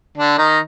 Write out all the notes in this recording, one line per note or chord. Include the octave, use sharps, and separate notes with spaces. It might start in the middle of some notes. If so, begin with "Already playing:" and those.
D3 D4
D#3 D#4